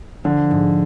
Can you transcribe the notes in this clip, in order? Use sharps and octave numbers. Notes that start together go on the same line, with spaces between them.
D3 F3
G#2